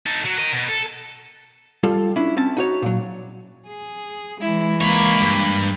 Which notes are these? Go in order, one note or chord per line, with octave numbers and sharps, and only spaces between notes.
D#4 A4
F#3
A#4 D#5
B2
A4
G3 F4 A4
C#4 D4 E4
C4 C#4 A5
D#4 F#4 C#5
A#2 F#3
G#4
E3 G#3 E4
C#2 A#3 C#5 B5
G2